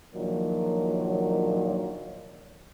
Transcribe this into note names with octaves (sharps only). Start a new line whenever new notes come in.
A#1 A#2 D#3 F3 F#3